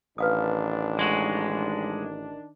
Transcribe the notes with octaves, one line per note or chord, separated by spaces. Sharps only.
A1 D#3 D4 B4 F5 D#6
G#3 F#4